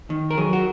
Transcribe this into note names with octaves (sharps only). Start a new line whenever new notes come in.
D#3
A#4
F#3 G#4
F#4